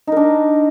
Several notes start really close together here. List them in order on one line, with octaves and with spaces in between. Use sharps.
D#4 A#4 D4